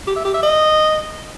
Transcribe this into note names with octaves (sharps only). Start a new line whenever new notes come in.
G4
E5
G4
E5
D#5